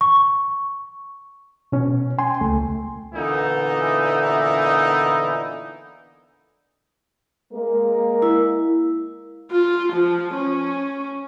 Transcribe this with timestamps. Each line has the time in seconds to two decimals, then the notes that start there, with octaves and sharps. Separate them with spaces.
0.01 C#6
1.72 B2 C#4
2.18 G5 G#5 C6
2.41 C#2 A3
3.14 A#2 D3 E3 B3 D#4 E4
7.53 G#3 A#3 A#4
8.22 E4
9.51 F4
9.93 F3
10.35 C#4